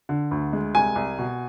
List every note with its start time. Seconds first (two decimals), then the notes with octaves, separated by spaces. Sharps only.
0.09 D3
0.31 D2
0.53 G#3
0.75 C2 G#5
0.96 C2
1.19 B2